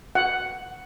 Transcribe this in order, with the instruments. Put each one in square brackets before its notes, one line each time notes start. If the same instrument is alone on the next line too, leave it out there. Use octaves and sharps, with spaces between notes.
[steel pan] F#5